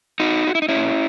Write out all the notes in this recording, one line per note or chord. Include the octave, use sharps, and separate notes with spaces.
D#4 F#4
F#4
E4
D#4
C#4 E4
A#2